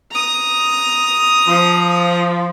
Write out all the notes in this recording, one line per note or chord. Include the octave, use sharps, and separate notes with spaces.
A#5 D#6
F3